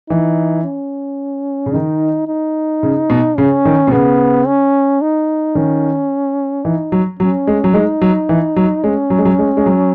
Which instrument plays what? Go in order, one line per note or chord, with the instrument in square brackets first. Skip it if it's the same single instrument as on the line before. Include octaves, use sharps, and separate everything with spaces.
[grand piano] E3 [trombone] D#4
[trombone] C#4
[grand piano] C#3
[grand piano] D#3 [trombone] D#4
[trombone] D#4
[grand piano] C#3
B2
[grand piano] C#3 [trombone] C#4
[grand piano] D#3
B2
[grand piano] C#3 [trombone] B3
[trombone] C#4
D#4
[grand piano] D#3 [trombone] C#4
[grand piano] E3 [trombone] D#4
[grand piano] F#3
[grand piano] F#3 [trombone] C#4
[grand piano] G#3
F#3
[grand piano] G#3 [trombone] D#4
[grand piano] F#3
E3
F#3
[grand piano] G#3 [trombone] C#4
[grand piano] F#3
G#3
F#3
G#3
G#3
F#3